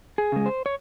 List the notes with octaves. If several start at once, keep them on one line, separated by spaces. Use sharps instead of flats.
G#4
C#3 G#3
C5
C#5